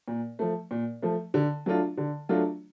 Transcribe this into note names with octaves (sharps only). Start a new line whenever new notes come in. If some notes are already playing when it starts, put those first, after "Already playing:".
A#2
F3 A3
A#2
F3 A3
D3
F#3 A3 D4 F4
D3
F#3 A3 D4 F4